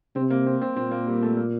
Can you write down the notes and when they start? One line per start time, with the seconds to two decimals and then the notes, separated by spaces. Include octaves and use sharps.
0.16 C3 C4
0.30 A#3
0.46 C4
0.61 C4
0.76 A#2 C4
0.91 A#3
1.07 G3
1.23 A3
1.37 A#3